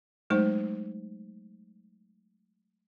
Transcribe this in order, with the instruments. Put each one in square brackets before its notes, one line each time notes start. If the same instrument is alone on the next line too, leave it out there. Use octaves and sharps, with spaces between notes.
[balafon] F#3 G#3 A3 D#4 C5